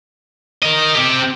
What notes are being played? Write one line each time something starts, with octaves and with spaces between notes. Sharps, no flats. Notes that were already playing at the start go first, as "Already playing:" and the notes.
A#4 D#5
C4 G4